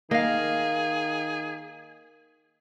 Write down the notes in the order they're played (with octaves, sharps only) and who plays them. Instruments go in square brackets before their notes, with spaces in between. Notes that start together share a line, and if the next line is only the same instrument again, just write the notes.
[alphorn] D#3 [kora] A#3 [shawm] G#4 [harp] D#5 F5